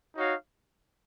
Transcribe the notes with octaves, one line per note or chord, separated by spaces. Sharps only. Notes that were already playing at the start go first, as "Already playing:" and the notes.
D#4 F#4 C#5 F5